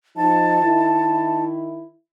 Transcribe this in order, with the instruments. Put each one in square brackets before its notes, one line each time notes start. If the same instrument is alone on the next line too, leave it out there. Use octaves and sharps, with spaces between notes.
[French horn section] F3 D#4 [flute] A5
[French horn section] D#3 E4